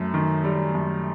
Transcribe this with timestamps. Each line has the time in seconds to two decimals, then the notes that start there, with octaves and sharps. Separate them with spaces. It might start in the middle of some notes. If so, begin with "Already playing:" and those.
Already playing: F#2 A3
0.14 D#3
0.44 G3
0.75 F#2